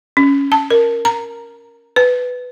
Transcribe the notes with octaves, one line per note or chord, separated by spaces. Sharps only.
C#4
A5
A#4
A#5
B4